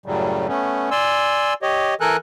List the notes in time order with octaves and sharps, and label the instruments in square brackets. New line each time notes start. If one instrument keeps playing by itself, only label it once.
[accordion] F#2 A2 C#3 F#3 G3
A3 B3 C#4
D5 G#5 C6 E6
G4 C#5 D#5
E3 A4 A#4 G#5 F#6